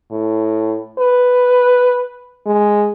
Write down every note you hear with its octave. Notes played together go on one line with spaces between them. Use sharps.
A2
B4
G#3